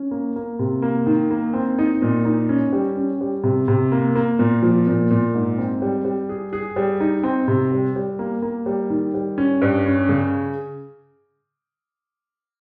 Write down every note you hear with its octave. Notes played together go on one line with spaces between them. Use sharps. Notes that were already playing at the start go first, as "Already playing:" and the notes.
Already playing: C#4
A#3
A#3
C3
A#3
D#3
A#3
C4
D#4
A#2
D#4
C#4
G3
C#4
G3
C3
C3
A#3
A#3
A#2
F3
A#2
A#2
G#2
C4
G3
G3
G#4
G#4
G3
D#4
C4
C3
G3
G3
A#3
A#3
G3
D#3
G3
C#4
G2
C#4
C#3